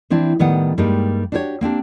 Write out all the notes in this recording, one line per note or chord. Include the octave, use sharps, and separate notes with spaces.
E3 C4 D4 E4
A2 D#3 G3 B3 F#5
G2 G3 G#3 A#3 D#4
D4 F#4 G4 A4 C#5
A#3 C4 D4 G4